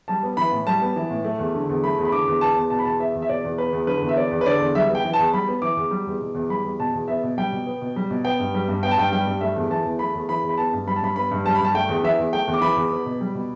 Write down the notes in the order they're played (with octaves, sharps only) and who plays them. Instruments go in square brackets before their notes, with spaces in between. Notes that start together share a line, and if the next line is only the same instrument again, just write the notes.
[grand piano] G3 A5
B3
E3 B5
A2
G3 A5
B3
E3
A2
A3
E2
D3
E2
A3 B5
E2
B5
D3 D6
E2
B3 A5
E2
B2 A5
B5
E2 A5
B3 E5
E2
E5
B2 D5
E2
B3 B4
E2
D3 B4
E2
E5
B3 D5
E2
B4
D3 D5
E2
G3 E5
B3
G5
E3
E2 A5
G3 B5
B3
E3 D6
E2
G3
E2
B2
E2
G3 B5
E2
B2 A5
E2
B3 E5
B2
G3 G5
B2
B3
B2
G3
B2
B3 G5
G2
G3
G2
B3 G5
A5
G2 G5
G3 G5
G2
A3 E5
E2
E3 A5
E2
A3 B5
E2
E3 B5
E2
B5
B3 A5
G2
G3 B5
A5
G2 B5
B3 B5
G2
G3 A5
B5
G2 A5
A3 G5
E2
E3 E5
E2
A3 G5
E2
D6
E3 B5
E2
B3
B2
G3
B2